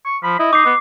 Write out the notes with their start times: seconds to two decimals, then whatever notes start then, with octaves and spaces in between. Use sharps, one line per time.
0.06 C#6
0.24 F3 B5
0.40 E4 D#5
0.53 D#4 D6 C7
0.66 B3